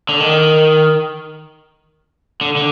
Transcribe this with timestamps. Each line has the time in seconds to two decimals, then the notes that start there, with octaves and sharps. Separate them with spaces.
0.09 D3
0.20 D#3
2.41 D3
2.57 D3